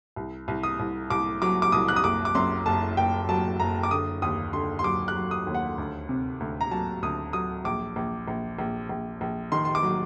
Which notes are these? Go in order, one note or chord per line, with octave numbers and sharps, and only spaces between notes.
C2
C2
D#6
C2
C2 D6
F#3 D6
D6
C2 D#6
F#6
D#6
F#1 D6
D6
F#2 C6
F#1 A5
F#1 G5
F#3 A5
F#1 A#5
D6
D3 D#6
D#2 D#6
D3 C6
C6
F#3 D6
F#6
F#3
D#6
D#2
F#5
D2
C3
D2
A#5
F#3 A5
D2 D#6
F#3 D#6
A#1 D6
A#1
A#1
A#1
A#1
A#1
D#3 C6
C6
D6
F#3